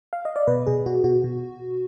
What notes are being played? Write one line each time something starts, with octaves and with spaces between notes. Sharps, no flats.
F5
D#5
D5
B2 B4
B2 G#4
B2 F#4
B2 F#4
B2